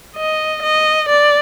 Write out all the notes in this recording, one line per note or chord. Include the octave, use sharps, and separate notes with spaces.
D#5
D#5
D5